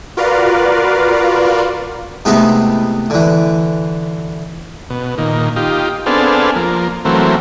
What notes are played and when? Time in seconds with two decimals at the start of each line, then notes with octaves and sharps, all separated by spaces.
0.17 F4 F#4 A#4 B4 D5 F5
2.25 C3 G#3 A3 B3 D#4 E4
3.10 D3 E3
4.90 B2
5.18 A#2 D#3
5.56 D#4 F4 G4
6.06 B3 C4 D4 G#4 A4 F5
6.56 F3 A#3
7.05 E3 F#3 A3 A#3 C4